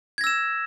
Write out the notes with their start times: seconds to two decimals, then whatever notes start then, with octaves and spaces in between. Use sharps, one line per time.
0.18 G#6
0.21 A#6
0.24 E6
0.27 E7